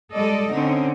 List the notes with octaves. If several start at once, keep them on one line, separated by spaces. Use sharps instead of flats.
G3 G#3 A4 D5 D#5
D3 C4 C#4 D#4